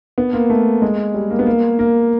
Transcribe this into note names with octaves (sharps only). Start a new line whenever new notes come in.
B3
A#3
A3
G#3
G3
A#3
B3
A#3
A#3